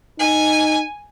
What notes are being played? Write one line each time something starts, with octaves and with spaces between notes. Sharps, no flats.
D#4 G#5